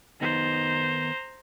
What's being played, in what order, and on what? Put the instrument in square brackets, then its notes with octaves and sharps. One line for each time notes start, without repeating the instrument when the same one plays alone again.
[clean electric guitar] D#3 B3 D#4 [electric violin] C5 A#5